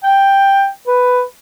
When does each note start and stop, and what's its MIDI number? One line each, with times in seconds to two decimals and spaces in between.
0.04 0.67 79
0.87 1.22 71